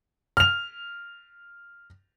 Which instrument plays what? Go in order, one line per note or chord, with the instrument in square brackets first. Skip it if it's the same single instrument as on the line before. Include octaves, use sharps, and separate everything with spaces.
[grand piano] F6 F7